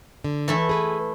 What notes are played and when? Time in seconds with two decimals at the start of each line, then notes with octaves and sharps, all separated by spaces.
0.24 D3
0.48 E3 A3 E4
0.69 G#4 B4